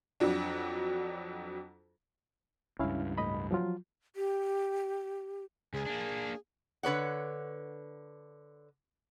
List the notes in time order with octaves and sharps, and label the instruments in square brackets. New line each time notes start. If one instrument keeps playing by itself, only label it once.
[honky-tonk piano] F2 F#3 D4
[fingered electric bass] C#2 G2 [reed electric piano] C#4 E4 F5
[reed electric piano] A2 D#5 B5
F3 F#3 F4
[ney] G4
[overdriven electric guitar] C#2 [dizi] G#4
[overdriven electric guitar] A#3 D4
[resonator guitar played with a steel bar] D3 B4 C#5 F#5